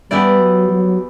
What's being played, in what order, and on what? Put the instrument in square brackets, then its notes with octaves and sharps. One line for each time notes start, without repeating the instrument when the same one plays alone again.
[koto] E3 B3 E4 G4 D5 [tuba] G3
[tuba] F#3
F#3